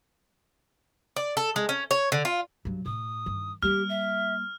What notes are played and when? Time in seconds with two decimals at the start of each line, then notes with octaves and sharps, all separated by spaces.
1.16 D5
1.37 A4
1.56 G#3
1.69 C#4
1.91 C#5
2.12 D3
2.25 F4
2.65 G2 F#3
2.86 A2 D#6
3.26 G2 D#3
3.63 G3 A#3 G4 F6
3.89 E5